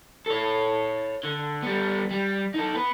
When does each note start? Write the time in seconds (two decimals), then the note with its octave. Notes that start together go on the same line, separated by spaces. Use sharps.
0.26 A4 C#5
1.24 D3
1.62 G3 B3
2.11 G3
2.54 D#4 A4
2.75 B3 B4